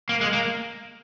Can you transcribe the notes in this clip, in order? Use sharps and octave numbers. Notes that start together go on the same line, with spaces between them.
A#3
G#3
A#3